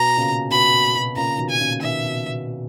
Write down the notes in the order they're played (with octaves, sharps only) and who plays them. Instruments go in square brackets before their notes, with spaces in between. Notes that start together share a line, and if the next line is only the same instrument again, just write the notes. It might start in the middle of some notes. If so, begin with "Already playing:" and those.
Already playing: [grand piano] B2 [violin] A#5
[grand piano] A#2 C#3
[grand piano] B2 [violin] B5
[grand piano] A#2
B2
[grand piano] A#2 C#3 [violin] A#5
[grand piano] B2 D#3
[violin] G#5
[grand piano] A#2 C#3
[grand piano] B2 D#3 [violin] E5
[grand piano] B2
B2